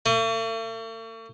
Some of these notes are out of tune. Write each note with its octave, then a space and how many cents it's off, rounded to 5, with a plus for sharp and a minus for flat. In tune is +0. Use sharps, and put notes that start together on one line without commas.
A3 +45